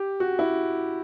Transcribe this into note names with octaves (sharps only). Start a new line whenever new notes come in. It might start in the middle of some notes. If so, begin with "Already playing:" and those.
Already playing: G4
F#4
E4